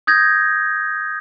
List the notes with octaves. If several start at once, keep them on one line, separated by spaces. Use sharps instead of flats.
D#6 G6 G#6 A#6